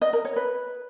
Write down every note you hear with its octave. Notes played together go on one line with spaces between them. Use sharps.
D#5
A#4
C#5
B4